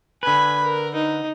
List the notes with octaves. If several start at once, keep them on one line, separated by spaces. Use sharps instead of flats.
D3 B4 G#5 B5
A#4
D#4